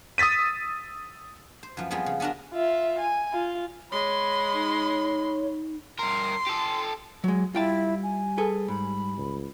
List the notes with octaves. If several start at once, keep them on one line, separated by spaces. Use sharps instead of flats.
D#6 E6 A6 B6 D#7
C5
F#2 F3 B3
F3 G3 B3 C4 G#4 A#4
C#3
B3 C#4 D4 F#4 A#4
F4 E5
G#5
F4
G#3 C#5 B5 C6
D#4
G2 A#4 C6
G4 A4
F#3 G#3
G3 E4 F4 G5 A5
G#5
G#4 A4 B4
G#2 B5
C#2